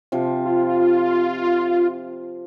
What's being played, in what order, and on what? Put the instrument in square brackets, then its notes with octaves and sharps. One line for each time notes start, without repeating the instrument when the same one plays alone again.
[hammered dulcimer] C3 F3
[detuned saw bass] F4